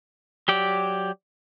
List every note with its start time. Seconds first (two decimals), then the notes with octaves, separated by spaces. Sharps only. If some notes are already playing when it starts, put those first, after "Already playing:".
0.48 F#3 G4 D5